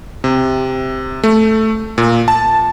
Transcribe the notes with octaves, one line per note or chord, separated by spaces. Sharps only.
C3
A3
A#2
A5